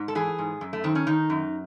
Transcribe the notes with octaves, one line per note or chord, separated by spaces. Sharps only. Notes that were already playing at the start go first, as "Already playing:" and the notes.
Already playing: G#2
A4
E3 G#4
G#2
F#2
A3
D#3 C4
C#4
D#3 D#4
F#2